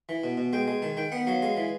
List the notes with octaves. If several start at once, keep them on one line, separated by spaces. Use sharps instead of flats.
E3
B2
B2
G#3 G5
G#3
D#3 A5
D#3 G5
B3 F#5
F#3 F5
G#3 F5
E3